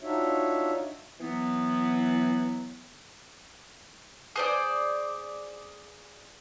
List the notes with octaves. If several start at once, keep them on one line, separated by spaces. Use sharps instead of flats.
D4 D#4 F4 F#4 C#5 E5
E3 F#3 B3
G#4 C5 D5